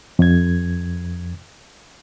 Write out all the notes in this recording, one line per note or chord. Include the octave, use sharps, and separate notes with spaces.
F2 G#6